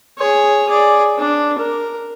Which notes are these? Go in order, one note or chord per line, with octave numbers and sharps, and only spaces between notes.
G#4 C#5
G#4 D5
D4
A#4